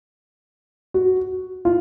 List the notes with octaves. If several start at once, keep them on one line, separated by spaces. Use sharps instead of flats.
F#4
F4